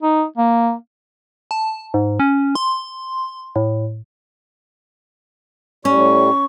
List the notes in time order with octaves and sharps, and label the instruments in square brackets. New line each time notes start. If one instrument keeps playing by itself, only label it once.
[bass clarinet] D#4
A#3
[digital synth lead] A5
G#2
C#4
C6
A2
[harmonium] A2 G3 [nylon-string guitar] C#4 [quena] C#6